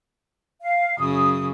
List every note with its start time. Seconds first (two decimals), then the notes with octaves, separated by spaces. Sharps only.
0.62 F5
0.99 F#2 C#3 D#6